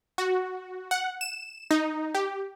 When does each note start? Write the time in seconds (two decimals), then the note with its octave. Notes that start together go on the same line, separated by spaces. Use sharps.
0.18 F#4
0.91 F#5
1.21 E7
1.71 D#4
2.15 G4